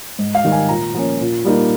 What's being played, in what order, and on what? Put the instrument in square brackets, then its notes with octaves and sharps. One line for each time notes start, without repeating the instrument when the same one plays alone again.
[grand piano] G#2
F5
D#3 G3
G#5
A#2 A#5
F3 A#3 C#4
A#2
G3 A#3 D#4